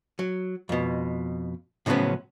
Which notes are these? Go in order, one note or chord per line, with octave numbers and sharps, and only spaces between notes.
F#3
F2 B2
A2 C#3 F3 F#3 B3 C#4